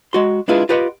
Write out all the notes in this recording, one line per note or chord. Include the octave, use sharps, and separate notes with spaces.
G#3 F#4 C6
G#3 D4 E4 F4 G#4 B4
F4 G4 B4 D#5 F#5